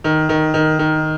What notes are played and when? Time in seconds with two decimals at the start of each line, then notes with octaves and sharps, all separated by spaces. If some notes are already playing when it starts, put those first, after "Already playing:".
0.04 D#3
0.29 D#3
0.54 D#3
0.79 D#3